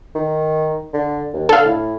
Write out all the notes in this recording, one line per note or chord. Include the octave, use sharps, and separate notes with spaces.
D#3
D3
D#2
D3 A4 F5
A2